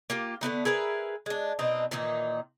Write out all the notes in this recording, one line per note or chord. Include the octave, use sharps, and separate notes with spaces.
A#3 F4 G4
D3 A3 B3 D#4
G#4 A#4 B4 E5
G#3 D4
B2 C4 D4 D#4
A#2 D#3 E3 D#4